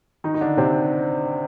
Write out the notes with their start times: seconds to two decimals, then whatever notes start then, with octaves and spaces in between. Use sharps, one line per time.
0.24 D#3 D#4
0.34 D#4
0.41 D3 D4
0.57 C3 C4